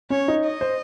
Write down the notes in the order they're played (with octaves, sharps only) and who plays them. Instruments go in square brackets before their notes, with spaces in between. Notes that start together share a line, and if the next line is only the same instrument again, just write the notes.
[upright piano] C#4 [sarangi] C#5
[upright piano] D#4
[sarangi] D#5
[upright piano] C5